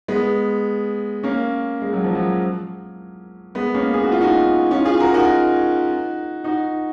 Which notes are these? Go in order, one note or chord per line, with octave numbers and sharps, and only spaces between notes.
G#3 B3
A#3 C#4
G#3
F#3
F3
F#3
G#3 B3
A#3 C#4
G#4
F#4
F4
D#4 F#4
C#4 F4
F4 G#4
F#4 A#4
D#4 F#4
D#4 F#4